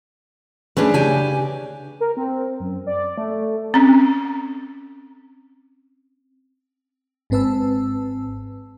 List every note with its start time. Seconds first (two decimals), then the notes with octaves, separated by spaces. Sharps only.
0.77 A3 C#4 D4 G#4 B4
0.94 C#3 G4 G#5
2.01 A#4
2.17 C4
2.60 F#2
2.87 D5
3.18 A3
3.74 C4 C#4
7.30 G#1 G#2 C4 B4 A5 E6